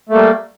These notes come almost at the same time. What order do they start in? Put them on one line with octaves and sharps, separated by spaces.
A3 A#3 G3